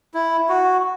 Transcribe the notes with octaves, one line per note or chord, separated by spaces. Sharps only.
E4
F#4